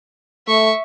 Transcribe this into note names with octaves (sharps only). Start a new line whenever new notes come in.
A3 E5 C#6